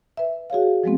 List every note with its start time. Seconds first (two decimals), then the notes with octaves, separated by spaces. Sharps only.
0.17 B4 E5
0.50 F#4 G#4 C#5 F5
0.84 F3 F#3 G#3 A3 B3 C4